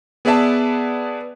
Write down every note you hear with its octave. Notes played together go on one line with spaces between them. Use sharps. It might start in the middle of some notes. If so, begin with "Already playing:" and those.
B3 G#4 B4 D5 E5 A5